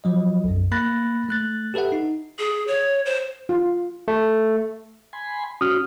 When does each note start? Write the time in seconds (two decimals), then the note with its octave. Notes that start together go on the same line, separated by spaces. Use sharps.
0.04 F3 F#3 D#5
0.44 B1 F#2
0.72 A#3 B5 F#6 A6 A#6
1.29 A3 F#6 A6
1.74 G4 A4 B4 E5 F#5
1.92 D#4
2.39 G#4
2.67 C#5
3.06 C5
3.49 F4
4.08 A3
5.13 G#5 B5 C6
5.61 C#4 F#4 D#6 F6